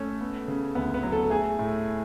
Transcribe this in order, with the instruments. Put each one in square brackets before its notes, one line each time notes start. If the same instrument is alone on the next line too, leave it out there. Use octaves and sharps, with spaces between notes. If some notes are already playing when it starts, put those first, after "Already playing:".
Already playing: [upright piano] A3 [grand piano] C#4
[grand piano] B3
C#3
[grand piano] D2 [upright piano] B3
[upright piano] B3
[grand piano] F#3
[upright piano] A4
[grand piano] A3 [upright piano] G#4
[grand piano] A2